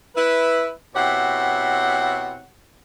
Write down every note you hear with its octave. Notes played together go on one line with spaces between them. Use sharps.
E4 B4
B2 C4 E4 G4 C#5 F#5